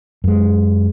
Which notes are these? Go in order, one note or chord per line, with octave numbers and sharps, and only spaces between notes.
F#2 G#3